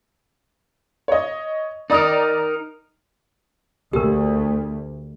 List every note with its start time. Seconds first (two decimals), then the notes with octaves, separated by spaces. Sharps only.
1.08 C#5 D#5
1.90 D#4 A#4 D5 A#5 D#6
3.93 D2 G4 A#4